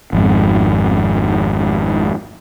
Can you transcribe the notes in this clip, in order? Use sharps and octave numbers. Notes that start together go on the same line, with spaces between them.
G#1 F2 G#2